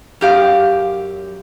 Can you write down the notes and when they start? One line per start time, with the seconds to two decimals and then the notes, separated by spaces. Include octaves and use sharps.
0.21 F#2 G4 F5